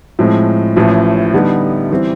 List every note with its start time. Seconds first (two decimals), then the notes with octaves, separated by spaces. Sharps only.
0.19 A2 F3 G#3 C4
0.76 A1 A2 F3
1.33 D3 G3 B3 D#4
1.91 E3 G3 C4